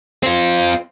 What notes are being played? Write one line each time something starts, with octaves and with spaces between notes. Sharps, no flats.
C4 F4